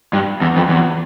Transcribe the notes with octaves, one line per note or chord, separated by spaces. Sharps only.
G2
E2
F2
E2